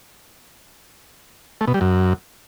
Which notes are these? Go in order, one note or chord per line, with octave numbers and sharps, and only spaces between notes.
A3
B2
G3
F#2